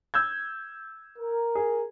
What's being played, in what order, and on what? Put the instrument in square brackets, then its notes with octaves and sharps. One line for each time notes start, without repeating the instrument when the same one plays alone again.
[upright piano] E6 G6 G#6
[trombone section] A#4
[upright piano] G#4